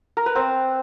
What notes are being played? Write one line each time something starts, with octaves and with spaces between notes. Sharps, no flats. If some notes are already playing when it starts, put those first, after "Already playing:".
A#4
B4
C4